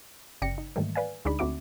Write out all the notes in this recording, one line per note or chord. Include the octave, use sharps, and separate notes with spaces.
G1 C#3 D5 G5 A#6 C#7
D#4
G#2 D#3 E3 G3 A3 A#3
B4 D5 F5 G#5
D2 G#3 D4 D#4 D5 B5
D2 A3 C4 F#4 E5 D6